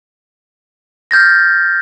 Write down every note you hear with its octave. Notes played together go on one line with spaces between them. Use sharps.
F6 G6 A6 A#6